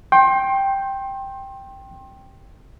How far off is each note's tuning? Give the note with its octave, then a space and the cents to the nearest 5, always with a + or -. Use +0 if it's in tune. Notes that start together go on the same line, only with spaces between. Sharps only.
G5 +0 C6 +30